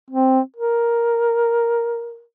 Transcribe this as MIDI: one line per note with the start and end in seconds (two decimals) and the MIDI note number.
0.11 0.40 60
0.56 2.23 70